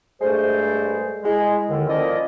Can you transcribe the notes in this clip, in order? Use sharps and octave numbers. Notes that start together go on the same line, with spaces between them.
G2 G#3 A3 A4 C5
G#3 E4
D#2 D3 D#3
F3 A#3 C#4 E4 D5 D#5